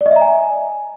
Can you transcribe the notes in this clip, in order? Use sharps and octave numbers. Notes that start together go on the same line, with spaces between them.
D5
D#5
E5
A#5
G#5